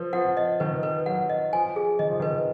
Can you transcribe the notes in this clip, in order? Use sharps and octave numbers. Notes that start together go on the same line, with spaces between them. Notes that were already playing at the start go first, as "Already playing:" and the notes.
Already playing: F3 B4
F3 F#5
D#5
D#3 B4
B4
F#3 F#5
D#5
F3 G#5
G#4
D#3 D#5
F3
D#3 B4